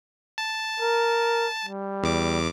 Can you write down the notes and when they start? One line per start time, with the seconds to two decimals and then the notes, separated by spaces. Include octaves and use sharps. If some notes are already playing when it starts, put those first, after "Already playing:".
0.38 A5
0.80 A#4
1.65 G3
2.03 E2 D6